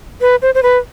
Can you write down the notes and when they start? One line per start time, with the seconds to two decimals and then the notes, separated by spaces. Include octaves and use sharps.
0.21 B4
0.42 C5
0.55 C5
0.63 B4